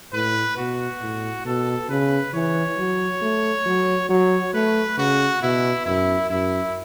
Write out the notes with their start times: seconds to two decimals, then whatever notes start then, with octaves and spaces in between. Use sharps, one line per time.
0.13 A2 B4
0.57 B2 F#4
1.01 A2
1.45 B2 A4
1.89 C#3 B4
2.34 E3 C#5
2.78 F#3
3.22 A3
3.66 F#3
4.09 F#3 C#5
4.54 A3 B4
4.98 C#3 F#4
5.42 B2 E4
5.85 F#2 E4
6.29 F#2 E4